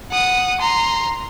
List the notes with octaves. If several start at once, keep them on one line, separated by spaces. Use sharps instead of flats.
F#5 D#6
A#5 C6